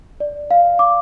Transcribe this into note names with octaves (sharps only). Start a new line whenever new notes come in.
D5
F5
D6